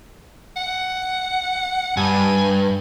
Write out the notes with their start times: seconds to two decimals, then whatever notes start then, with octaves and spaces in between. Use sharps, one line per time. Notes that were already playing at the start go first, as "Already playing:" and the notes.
0.56 F#5
1.97 G2 G#5